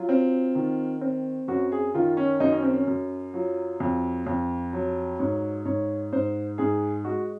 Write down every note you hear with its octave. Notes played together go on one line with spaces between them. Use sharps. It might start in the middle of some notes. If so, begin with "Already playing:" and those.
Already playing: F#3 F4
C4
D#3
C4
F#2 F#4
G#4
D#3 F4
C#4
F#2 D#4
C#4
C4
C#4
F#2
F#3 F4
F2
F2
F#3
G#2 C#5
G#2 C#5
G#2 C5
G#2 G#4
G#3 F#4